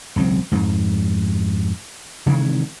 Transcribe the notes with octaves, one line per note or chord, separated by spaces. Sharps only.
E1 C#2 F#3 C4
F2 G#2
C3 D#3 E3 G#3